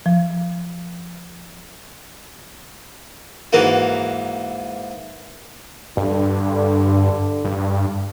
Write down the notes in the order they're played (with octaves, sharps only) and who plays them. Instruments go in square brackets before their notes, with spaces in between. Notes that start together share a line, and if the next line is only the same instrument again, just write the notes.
[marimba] F3
[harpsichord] G#2 E3 A#3 F#4
[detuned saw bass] G2 [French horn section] D3
[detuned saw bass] G2